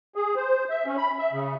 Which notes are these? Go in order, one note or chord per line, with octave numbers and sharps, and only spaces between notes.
G#4
C5
E5
C#4
B5
E5
C#3